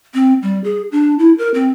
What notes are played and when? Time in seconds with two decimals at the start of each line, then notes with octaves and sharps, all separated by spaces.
0.14 C4
0.42 G3
0.64 G#4
0.92 D4
1.19 E4
1.38 A#4
1.54 C4